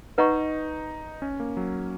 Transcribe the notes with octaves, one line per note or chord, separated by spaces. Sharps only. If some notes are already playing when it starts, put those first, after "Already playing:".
D#4 B4 D#5 F#5 A#5 C#6
C#4
A#3
F#3